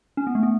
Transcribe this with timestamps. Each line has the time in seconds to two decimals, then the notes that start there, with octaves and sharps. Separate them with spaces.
0.17 C#4
0.27 B3
0.35 A3
0.43 B3